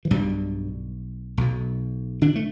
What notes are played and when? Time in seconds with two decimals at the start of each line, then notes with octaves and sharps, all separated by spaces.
0.05 E3
0.11 B1 G2 B2 G3
1.37 B1 B2
2.21 D3 D4
2.35 A3